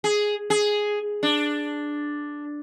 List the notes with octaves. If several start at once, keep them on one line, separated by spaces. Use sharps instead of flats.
G#4
G#4
D4